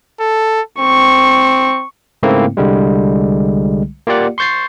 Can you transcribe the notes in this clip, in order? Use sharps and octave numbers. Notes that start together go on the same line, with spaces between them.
A4
C4 C#6
G#2 C#3 A3 A#3 C4 E4
C2 D3 G3 G#3
A#3 F4 G4 D5 F#5
C6 C#6 G6 A6 C7